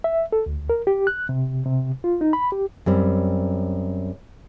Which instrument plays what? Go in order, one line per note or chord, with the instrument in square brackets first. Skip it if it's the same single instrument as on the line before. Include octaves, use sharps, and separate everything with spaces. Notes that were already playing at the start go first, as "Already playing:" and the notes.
[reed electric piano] E5
A4
D2
A#4
G4
F#6
C3
C3
F4
D#4
B5
G4
[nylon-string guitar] F#2 G3 C4